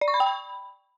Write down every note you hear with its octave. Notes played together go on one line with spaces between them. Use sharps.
D5
C#6
B5
G5
B5